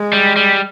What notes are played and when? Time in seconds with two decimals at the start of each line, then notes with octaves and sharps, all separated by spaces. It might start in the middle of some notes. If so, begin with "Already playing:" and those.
Already playing: G#3
0.13 G3
0.36 G3